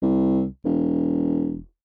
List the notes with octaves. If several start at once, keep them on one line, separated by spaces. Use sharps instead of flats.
C2
E1